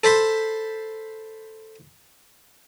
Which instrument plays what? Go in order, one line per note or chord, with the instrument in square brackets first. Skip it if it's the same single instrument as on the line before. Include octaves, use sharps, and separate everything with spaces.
[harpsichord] A4 C5 B5 C6